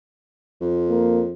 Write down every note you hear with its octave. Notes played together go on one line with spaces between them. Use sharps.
F2
A#3